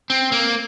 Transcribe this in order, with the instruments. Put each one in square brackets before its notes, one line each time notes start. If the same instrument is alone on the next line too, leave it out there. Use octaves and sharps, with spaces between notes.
[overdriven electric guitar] C4
A#3